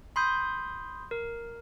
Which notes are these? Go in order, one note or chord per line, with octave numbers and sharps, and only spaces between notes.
B5 C6 D#6 G6
A#4